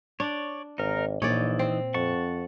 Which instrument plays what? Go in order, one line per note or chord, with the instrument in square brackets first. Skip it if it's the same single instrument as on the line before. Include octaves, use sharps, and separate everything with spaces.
[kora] D4 [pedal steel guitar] C#5 D5
[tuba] G#1 [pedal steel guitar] D#4 A#4
[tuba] A#1 [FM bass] A#2 [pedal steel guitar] E3 D#4 [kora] C#5 D5
[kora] C4
[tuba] F2 [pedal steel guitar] F#5 A5 C#6